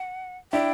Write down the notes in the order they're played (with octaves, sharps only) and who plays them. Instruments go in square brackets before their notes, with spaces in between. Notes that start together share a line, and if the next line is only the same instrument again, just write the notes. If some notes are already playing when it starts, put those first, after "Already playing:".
Already playing: [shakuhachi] F#5
[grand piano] D4 E4 [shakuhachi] G5